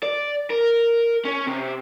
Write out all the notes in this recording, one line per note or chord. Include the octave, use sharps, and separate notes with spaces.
D5
A#4
C#4
C3